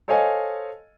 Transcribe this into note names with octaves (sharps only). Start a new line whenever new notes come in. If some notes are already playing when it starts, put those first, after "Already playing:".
A4 C5 C#5 D#5 F5 G#5